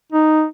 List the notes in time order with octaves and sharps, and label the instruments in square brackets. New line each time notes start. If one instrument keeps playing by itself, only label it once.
[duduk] D#4